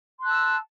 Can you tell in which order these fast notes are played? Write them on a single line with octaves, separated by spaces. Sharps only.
C6 F#6 A5 E6